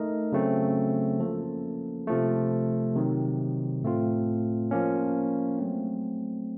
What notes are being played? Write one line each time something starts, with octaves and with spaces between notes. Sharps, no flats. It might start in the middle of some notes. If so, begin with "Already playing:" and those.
Already playing: A3 D#4 A#4 D#5
C#3 F#3 A3 C4
F3 A#3 C#4 A4
C3 F3 A3
C3 D#3 F#3
A2 A3 C4 F4
F3 A#3 C#4
F#3 A3 C4